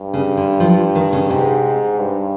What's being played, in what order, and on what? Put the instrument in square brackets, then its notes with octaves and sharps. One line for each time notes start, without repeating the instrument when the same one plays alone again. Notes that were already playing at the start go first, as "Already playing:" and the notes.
Already playing: [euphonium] G2
[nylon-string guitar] C#3
D3
F3
D#3
C#3
[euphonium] G#2 [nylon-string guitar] C3
[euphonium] G2